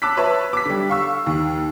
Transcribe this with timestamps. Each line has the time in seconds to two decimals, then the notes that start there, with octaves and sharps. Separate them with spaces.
0.02 A5 D6 E6 F#6 B6
0.17 B4 C#5 E5 A5
0.53 D6 B6
0.65 D3 G3
0.90 F5 C#6 E6
1.26 D#2